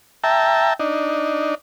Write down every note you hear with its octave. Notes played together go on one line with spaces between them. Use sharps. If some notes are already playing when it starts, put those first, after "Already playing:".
E5 G5 A5 A#5
D4 D#4